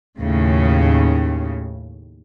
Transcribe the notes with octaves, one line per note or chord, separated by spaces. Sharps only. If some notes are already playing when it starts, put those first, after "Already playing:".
D#2 A2 C#3